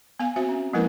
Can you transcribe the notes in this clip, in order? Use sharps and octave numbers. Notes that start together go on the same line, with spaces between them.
B3 F5 G#5
C4 F#4 C5 E5
C#4
F3 G#3 A#3 E4 A#4 B4